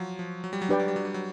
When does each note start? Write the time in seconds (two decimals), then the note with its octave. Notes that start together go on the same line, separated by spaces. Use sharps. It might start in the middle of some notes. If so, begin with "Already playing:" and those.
Already playing: F3 F#3
0.19 F3
0.44 F#3
0.53 G3
0.62 F#3
0.69 G3 D4 G4 B4 D5 G5
0.80 F#3
0.88 G3
0.96 F#3
1.05 G3
1.14 F#3